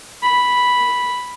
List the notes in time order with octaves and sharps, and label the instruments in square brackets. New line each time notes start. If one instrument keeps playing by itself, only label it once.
[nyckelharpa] B5